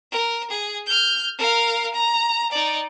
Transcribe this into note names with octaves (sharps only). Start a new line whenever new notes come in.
A#4
G#4
F6 G6
A#4 F5
A#5
D#4 D5